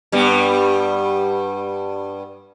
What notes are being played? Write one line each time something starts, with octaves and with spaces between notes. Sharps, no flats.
G2 G3 B3